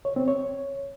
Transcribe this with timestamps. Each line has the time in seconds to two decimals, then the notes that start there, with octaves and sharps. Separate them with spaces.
0.05 C#5
0.16 C4
0.28 C#5